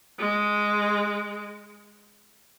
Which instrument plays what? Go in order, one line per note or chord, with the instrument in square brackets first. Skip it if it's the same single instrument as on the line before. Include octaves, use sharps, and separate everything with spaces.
[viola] G#3